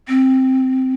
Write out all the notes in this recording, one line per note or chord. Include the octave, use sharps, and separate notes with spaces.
C4